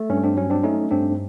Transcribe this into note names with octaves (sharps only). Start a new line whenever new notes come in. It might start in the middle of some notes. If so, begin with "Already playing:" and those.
Already playing: A3
G2 C#4
C4 D4
F#3 C#4
C4 D4
A3 C#4 D#4
G2 C4 D4